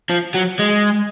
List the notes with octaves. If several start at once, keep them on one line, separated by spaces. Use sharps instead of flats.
F3
F#3
G#3